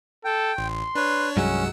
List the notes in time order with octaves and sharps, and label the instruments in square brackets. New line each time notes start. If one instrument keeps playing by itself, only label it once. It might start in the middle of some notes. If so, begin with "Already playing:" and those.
[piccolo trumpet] A4 [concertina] G5
[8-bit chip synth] A1 [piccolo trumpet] C6
[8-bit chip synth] D4 C#5 [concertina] B4
[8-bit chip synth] C2 F#5 E6 [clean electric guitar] G2 F#3 G#3 [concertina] C#4